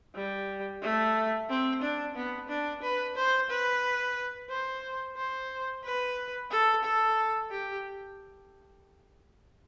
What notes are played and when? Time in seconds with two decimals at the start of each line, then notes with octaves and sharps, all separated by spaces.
0.15 G3
0.82 A3
1.49 C4
1.82 D4
2.15 B3
2.49 D4
2.82 B4
3.16 C5
3.50 B4
4.50 C5
5.17 C5
5.84 B4
6.51 A4
6.84 A4
7.51 G4